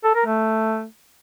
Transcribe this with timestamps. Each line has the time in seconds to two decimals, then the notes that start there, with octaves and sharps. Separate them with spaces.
0.04 A4
0.15 A#4
0.26 A3